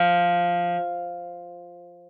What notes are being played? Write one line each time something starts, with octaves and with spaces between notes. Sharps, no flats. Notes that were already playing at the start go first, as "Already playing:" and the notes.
Already playing: F3